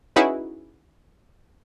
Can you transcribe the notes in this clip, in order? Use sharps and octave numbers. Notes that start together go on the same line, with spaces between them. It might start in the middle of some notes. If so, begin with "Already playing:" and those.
C#4 D#4 E4 F#4 G#4 B4